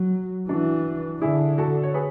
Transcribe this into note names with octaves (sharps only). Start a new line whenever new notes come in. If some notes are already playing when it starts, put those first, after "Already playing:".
Already playing: F#3
E3 D4 F#4
D3 E4 G#4
F#4 A4
C#5
G#4 B4